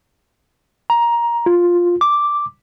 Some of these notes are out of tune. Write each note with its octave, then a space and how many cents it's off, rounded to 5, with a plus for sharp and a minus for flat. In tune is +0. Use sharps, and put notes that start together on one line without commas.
A#5 +15
F4 +5
D6 +0